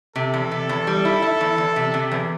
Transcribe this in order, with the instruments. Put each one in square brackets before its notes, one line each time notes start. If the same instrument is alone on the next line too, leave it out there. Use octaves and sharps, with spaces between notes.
[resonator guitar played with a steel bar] C3 [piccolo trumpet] A4
[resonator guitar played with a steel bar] E2
C3
E2
G3
E4
E4
E2
E2
C3
C3
E2